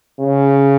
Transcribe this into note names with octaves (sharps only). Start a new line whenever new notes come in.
C#3